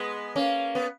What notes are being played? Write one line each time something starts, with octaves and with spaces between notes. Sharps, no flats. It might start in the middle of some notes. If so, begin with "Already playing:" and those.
Already playing: G#3 B3
A#3 C#4
B3